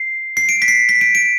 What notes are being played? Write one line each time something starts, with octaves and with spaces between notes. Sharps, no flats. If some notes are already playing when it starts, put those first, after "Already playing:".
Already playing: C7
C7
D7
B6
C7
B6
D7
D7